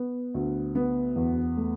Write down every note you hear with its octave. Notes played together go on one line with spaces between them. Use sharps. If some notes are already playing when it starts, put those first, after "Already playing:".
Already playing: B3
D2
B3
E2
A3